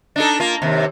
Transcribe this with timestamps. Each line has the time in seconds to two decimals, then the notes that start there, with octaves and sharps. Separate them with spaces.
0.16 D4 D#4 A4
0.40 A#3 F4
0.62 D#2 C3